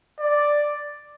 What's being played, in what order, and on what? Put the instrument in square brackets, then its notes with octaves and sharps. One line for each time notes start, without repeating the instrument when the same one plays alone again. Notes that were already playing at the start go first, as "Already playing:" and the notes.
[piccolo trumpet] D5